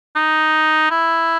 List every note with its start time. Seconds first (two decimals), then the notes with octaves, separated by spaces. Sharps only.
0.16 D#4
0.91 E4